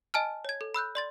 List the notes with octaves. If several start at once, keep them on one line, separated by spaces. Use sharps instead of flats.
D#5 G#5 A5 F6
C#5 G#6
A4
B5 E6 F#6 G6
D5 C6 A6